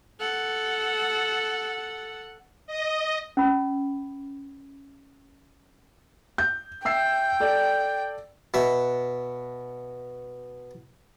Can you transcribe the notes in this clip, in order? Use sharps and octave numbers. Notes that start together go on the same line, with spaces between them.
A4 F#5
D#5
C#4 B5
G6
E5 G5 E6 C7
A4 D5
B2 E5